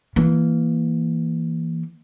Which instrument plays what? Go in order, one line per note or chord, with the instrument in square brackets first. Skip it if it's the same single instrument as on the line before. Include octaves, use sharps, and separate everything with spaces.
[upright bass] E3 A#3